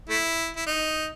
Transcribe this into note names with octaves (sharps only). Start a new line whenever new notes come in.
A3 E4
E4
D#4